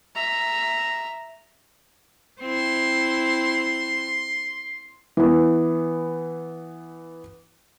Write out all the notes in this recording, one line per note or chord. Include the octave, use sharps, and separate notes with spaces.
E5 A#5
C4 E4 C6
E3 B3